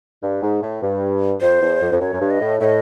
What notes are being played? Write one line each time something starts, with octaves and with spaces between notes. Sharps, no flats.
G2
G#2
A2
G2
F2 C5
E2
F2
F2
F#2 C#5
F#2
G2
D#5
A2
A2 D#5 E5